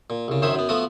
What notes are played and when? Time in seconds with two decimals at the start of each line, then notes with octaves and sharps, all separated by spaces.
0.10 A#2
0.28 C2 C#3
0.42 F#2 D#3 C#4 C5 E5 D#6
0.55 F#2 B3
0.69 F3 A3 B3 F#4 D#6